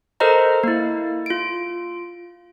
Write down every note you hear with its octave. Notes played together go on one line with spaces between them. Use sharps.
A4 A#4 C5 D#5 A#5
A#3 E4
F4 D7